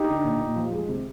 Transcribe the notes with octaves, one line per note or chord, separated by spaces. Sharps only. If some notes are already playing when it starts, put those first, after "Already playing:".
Already playing: D#4 G4
D3
A#2
A#2
F3
G#3
C3